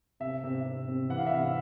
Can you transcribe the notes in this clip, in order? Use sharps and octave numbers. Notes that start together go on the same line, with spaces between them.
C3 E5
C3
C3
C3
E3 F#5
F5
E5
C3 F5